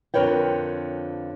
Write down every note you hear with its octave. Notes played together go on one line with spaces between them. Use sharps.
F2 D3 A#4 B4 C#5 G5